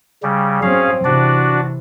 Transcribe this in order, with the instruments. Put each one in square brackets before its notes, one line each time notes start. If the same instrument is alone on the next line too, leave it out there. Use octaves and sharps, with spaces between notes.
[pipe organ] C#3 G3
[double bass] F#3 C4 [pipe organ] C#4 G#4 F5
[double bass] C3 E3 [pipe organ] D4 F#4 D5